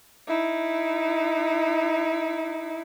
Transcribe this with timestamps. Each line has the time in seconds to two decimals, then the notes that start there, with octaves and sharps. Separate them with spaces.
0.27 D#4 E4